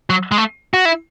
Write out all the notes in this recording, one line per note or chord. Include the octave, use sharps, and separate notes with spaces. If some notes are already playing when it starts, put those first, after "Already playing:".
F#3
G#3
A3
F#4
E4